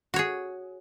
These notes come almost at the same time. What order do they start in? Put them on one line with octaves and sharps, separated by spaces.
F#4 C#5 G#4